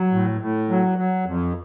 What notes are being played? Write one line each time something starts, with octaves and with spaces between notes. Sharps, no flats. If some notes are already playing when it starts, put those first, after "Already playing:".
Already playing: F#3
A2
A2
F#3
F#3
F2